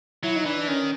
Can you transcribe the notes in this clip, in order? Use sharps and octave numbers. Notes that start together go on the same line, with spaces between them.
F#3 E4
D#4
E3 D4
D4
D#3 C#4